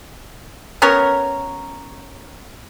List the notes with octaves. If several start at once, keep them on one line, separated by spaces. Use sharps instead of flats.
B3 C#4 A#4 C#5